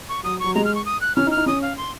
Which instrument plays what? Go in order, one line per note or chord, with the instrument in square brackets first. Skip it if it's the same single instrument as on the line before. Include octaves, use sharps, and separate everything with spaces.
[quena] C#6
[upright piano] F#3 [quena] D#6
[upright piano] F#3 [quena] C#6
[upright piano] G#3 [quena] A#5
[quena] F6
C#6
D#6
F#6
[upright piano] C#4 [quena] F6
[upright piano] D#4
[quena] F6
[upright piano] D#4
[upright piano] C#4 [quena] D#6
[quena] F5
C6